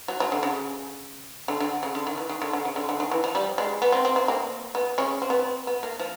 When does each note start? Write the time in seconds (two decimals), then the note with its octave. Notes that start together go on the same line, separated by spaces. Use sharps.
0.08 F#3
0.20 F#3
0.32 D3
0.43 C#3
1.48 D3
1.60 D3
1.83 C#3
1.95 D3
2.07 D#3
2.18 E3
2.29 D#3
2.42 D3
2.53 D3
2.65 C#3
2.76 D3
2.89 D3
3.00 D#3
3.11 E3
3.24 F3
3.35 G3
3.58 G#3
3.82 B3
3.92 C4
4.05 C4
4.16 C4
4.28 A#3
4.75 B3
4.98 C#3 C#4
5.22 C4
5.30 B3
5.39 C4
5.67 B3
5.83 A#3
6.00 F3